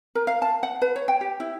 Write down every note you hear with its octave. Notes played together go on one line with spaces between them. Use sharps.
A#4
F5
A5
F#5
B4
C#5
G5
G4
E4